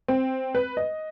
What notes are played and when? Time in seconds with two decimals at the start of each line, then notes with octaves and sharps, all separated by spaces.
0.08 C4
0.55 B4
0.77 D#5